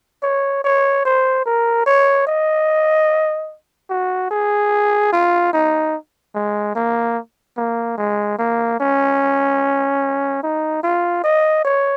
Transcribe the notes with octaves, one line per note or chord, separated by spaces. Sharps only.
C#5
C#5
C5
A#4
C#5
D#5
F#4
G#4
F4
D#4
G#3
A#3
A#3
G#3
A#3
C#4
D#4
F4
D#5
C#5